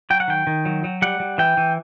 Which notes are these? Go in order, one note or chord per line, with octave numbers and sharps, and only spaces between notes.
F#3 G5
F#5
D#3 G5
D#3
F#3
F#3
G3 F#5
G3
E3 G5
E3